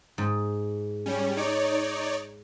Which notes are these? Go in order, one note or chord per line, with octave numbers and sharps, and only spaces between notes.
G#2
G3 C#4
D#4 C#5 D5